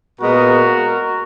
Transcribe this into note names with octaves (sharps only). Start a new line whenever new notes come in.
A#2 G#3 B3 F#4 A#4